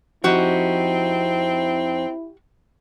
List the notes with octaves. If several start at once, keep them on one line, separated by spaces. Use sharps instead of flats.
F2 C4 D#4 E4 F#4 G4